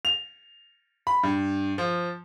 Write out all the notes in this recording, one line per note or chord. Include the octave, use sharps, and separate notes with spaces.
F7
B5
G2
F3